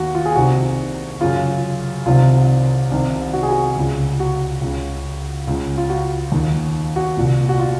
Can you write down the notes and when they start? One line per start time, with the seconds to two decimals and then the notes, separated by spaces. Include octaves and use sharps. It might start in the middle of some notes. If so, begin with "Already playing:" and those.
Already playing: D#2 D#3 F#4
0.15 F4
0.26 G#4
0.36 C2 C3 D#3 F#4
1.21 F#2 C#3 F4
2.06 C2 C3 D#3 F4
2.91 C2 C3 D#3
3.33 F#4
3.43 G#4
3.51 F#4
3.77 C#2 C#3
4.20 F#4
4.61 C#2 C#3
5.47 C#2 C#3
5.78 F4
5.90 F#4
6.32 D#2 D#3
6.96 F#4
7.17 C2 A#2
7.49 F#4
7.59 F4